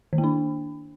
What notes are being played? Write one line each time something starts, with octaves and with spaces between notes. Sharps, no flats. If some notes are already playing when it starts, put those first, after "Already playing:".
D#3
A#3
D4